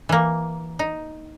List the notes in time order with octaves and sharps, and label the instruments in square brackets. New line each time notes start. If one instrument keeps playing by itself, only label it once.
[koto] E3 A#3
D#4